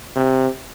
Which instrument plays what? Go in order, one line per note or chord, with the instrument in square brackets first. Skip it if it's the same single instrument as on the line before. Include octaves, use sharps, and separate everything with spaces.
[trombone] C3